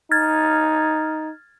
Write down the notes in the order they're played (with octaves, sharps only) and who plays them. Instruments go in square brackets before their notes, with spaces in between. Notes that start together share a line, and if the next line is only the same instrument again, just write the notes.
[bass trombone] D#4 [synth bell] F6 G#6 A6